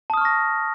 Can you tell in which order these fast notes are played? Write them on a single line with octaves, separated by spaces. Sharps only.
A5 D#6 F6 C#6 A#6